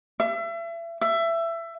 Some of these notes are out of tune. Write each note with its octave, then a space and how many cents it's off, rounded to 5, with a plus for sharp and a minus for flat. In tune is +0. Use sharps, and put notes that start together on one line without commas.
E5 +35
E5 +20